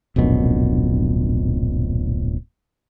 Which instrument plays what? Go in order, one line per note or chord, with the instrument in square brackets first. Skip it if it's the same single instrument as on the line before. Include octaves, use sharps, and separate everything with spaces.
[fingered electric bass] D1 A#1 F#2 B2